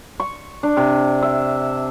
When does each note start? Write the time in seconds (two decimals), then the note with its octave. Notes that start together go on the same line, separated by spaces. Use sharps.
0.20 C#6
0.63 D4
0.77 C3
1.22 E5